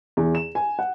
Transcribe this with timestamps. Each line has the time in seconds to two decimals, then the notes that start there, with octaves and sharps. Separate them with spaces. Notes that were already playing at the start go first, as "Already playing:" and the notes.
0.17 E2
0.35 E7
0.55 G#5
0.79 F#5